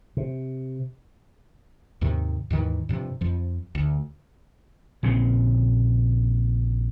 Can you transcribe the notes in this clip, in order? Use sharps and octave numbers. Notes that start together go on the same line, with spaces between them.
C3
D#2 G#2 C3 D#3
D#2 G#2 D#3 E3
G2 C3 F3
F2 F3
D2
A#1 A#2 C#3 C4